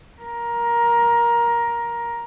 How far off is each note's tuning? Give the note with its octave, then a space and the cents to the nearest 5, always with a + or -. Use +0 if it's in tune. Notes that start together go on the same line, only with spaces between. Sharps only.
A#4 +15